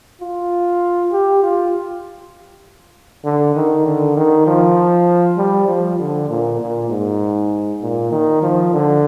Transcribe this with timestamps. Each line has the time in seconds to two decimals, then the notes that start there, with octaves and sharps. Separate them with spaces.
0.21 F4
1.12 G4
1.43 F4
3.25 D3
3.56 D#3
3.87 D3
4.17 D#3
4.47 F3
5.38 G3
5.68 F3
6.00 D3
6.29 A#2
6.60 A#2
6.90 G#2
7.82 A#2
8.11 D#3
8.43 F3
8.73 D3